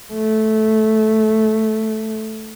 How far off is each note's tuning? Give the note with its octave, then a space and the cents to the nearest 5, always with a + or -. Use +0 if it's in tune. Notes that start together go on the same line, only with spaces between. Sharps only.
A3 -10